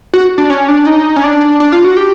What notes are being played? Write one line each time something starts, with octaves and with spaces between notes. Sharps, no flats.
F#4
D4
C#4
D4
D#4
C#4
D4
D4
F4
F#4
G4